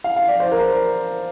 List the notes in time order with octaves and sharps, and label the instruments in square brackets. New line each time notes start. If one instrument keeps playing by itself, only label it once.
[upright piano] F5
F5
D5
C5
A#4